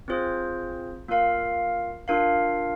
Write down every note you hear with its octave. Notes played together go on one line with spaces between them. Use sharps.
C4 F4 G#4 C5
A#3 F4 A#4 F5
D4 F4 A#4 F5